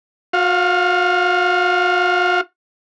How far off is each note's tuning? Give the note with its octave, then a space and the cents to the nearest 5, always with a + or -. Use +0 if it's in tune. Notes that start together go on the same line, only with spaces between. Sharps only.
F#4 -40 F5 +0